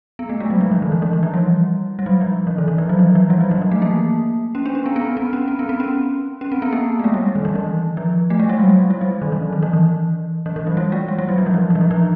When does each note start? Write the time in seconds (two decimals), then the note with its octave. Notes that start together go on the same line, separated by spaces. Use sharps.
0.19 B3
0.29 A3
0.40 G#3
0.50 F#3
0.61 F3
0.71 E3
0.82 D#3
0.92 E3
1.02 E3
1.13 E3
1.23 F3
1.34 G3
1.99 G3
2.06 F#3
2.21 F3
2.47 E3
2.58 D#3
2.68 E3
2.78 F3
2.89 F#3
2.99 E3
3.15 F3
3.30 G3
3.41 F#3
3.51 E3
3.62 F3
3.72 A3
3.82 A#3
4.55 C#4
4.66 D4
4.75 C#4
4.86 B3
4.96 B3
5.02 C4
5.17 C4
5.33 C#4
5.48 C4
5.59 B3
5.69 C4
5.80 C#4
6.41 C#4
6.52 C4
6.62 B3
6.73 A#3
6.99 A3
7.04 G#3
7.14 G3
7.35 D#3
7.45 E3
7.55 E3
7.97 F3
8.30 A3
8.40 G#3
8.49 G3
8.60 F#3
8.69 G3
8.90 G3
9.01 F#3
9.22 D#3
9.32 E3
9.53 D#3
9.63 E3
9.73 E3
10.46 E3
10.56 E3
10.67 F#3
10.77 G3
10.92 G#3
11.08 G3
11.19 G3
11.29 F#3
11.38 F3
11.46 E3
11.54 F3
11.70 E3
11.75 F3
11.81 E3
11.91 F3